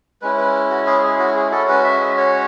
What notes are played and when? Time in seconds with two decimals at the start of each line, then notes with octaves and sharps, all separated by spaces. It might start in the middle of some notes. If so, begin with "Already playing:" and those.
0.22 G#3 C#4 E4 B4
0.38 B4
0.70 F#4
0.86 G#4
1.04 G#4
1.19 F#4
1.36 G#4
1.51 G#3 C#4 F#4 A4
1.68 B4
1.84 E5
2.00 D#5
2.17 C#5